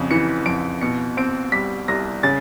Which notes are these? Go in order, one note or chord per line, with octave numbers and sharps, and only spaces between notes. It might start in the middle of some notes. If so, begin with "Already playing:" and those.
Already playing: F2 C#3
E3 C#7
F2 D7
B2 C#7
C4 D7
G3 B6
C2 A#6
C#3 A6